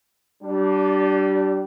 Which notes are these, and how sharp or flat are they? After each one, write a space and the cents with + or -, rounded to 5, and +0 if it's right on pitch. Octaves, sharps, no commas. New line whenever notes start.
G3 -30 D4 +0